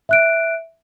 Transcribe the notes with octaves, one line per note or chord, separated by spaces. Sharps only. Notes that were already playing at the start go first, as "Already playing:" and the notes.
E5 F#6 D7